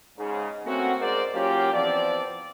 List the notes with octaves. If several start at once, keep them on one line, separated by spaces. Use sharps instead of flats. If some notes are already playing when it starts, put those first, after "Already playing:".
G#2 C#3
A3 A#3 C4 C#4 F#4
G#2 G#4 A#4 C5 D5
F#3 A#3 C#4 F4 G4
E3 F3 B3 C4 D5